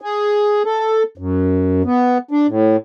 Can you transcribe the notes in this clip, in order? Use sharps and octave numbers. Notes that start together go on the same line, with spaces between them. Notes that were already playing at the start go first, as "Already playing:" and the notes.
G#4
A4
F#2
B3
D4
A2